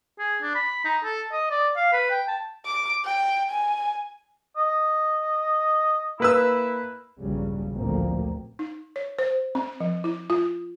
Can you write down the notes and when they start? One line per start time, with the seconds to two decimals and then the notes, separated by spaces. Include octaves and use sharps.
0.19 G#4
0.42 D4
0.55 B5
0.85 D#4
1.04 A4
1.32 D#5
1.51 D5
1.76 F5
1.93 B4
2.11 G5
2.28 A5
2.66 D6
3.05 G5
3.51 G#5
4.57 D#5
6.20 A#3 E4 B4 E6
7.19 A#1 E2 G2 C#3 F#3 G3
7.73 A1 D2 A#2 F3 A#3 C4
8.59 D#4
8.96 C#5
9.19 C5
9.55 C4
9.80 F3
10.04 E4
10.30 F4